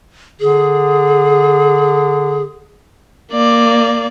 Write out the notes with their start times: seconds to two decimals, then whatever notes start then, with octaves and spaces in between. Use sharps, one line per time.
0.40 D3 G#4
3.32 A#3 D5